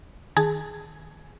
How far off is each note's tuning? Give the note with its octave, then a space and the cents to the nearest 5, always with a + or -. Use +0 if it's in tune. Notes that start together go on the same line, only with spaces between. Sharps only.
D#3 +0 G#4 +0 A5 +0